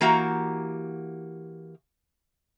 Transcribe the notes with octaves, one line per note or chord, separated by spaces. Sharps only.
E3 A#3 F#4 G4 F#5 A#5